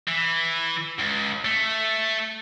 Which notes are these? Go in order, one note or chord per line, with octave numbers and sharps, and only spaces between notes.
E3
C#2
A3